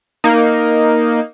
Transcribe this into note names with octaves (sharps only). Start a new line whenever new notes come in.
A#3 D#4